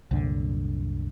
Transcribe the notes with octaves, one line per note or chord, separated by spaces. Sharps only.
C2 F#2 A#2 D3